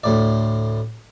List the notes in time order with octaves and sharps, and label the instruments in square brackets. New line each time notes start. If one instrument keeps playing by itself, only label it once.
[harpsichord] D2 A2 D5